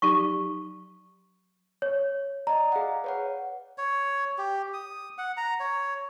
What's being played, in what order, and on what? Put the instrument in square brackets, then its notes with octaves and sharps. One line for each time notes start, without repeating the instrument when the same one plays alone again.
[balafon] F#3 D#4 G4 [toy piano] C#6
[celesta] C#5
[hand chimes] D5 D#5 [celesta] A#5
[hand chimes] G#4 F5 F#5
B4 C#5 F#5
[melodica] C#5
G4
D#6
F#5
A#5
C#5